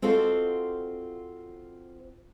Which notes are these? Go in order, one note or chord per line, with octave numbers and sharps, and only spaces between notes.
C4 F4 F#4 A4 C5 D#5